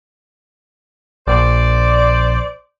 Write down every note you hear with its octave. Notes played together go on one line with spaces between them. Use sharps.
A#1 C5 D5